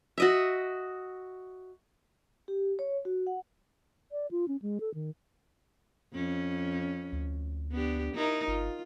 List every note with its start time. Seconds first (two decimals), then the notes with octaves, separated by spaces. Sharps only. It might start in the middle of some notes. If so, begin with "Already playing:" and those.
0.18 F#4 D#5 E5
2.48 G4
2.79 C#5
3.05 F#4
3.27 F#5
4.12 D5
4.31 F4
4.48 C#4
4.62 G#3
4.80 A4
4.94 D#3
6.13 F2 C#4
7.12 D2
7.71 B3 D4 G4
8.14 D#4 E4 A#4
8.47 G1 F4